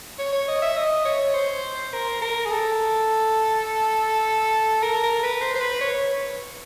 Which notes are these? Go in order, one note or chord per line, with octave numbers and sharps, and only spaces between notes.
C#5
C#5
D#5
E5
D#5
C#5
C5
A#4
A#4
G#4
A4
A#4
A#4
B4
C5
C5
B4
C#5